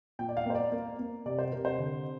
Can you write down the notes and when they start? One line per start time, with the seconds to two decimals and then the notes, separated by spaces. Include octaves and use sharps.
0.19 A#2 G5
0.29 D5
0.37 F5
0.46 A#3 C5
0.55 D5
0.72 A#3
0.99 A#3
1.26 C3 D5
1.39 C5
1.52 C3 A#4
1.65 C5
1.79 D3